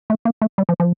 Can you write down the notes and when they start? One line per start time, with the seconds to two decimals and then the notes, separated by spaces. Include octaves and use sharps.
0.10 A3
0.25 A#3
0.42 A3
0.58 G3
0.69 F3
0.80 F3